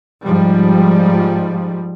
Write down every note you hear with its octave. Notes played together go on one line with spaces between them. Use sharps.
G#2 F3 G3